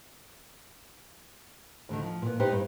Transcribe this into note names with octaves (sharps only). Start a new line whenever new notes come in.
D2 D3 D#3
F3
A#2 B3
B3 D#4 E4 G4 B4 C5
G2